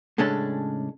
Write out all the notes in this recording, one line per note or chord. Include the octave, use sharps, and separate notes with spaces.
A2 C#3 G#3 C#4 D4 A4